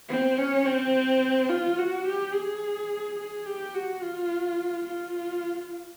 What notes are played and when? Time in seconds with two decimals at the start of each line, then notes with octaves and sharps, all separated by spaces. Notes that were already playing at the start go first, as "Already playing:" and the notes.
0.09 C4
0.38 C#4
0.65 C4
1.50 F4
1.78 F#4
2.07 G4
2.34 G#4
3.19 G#4
3.46 G4
3.75 F#4
4.02 F4
4.86 F4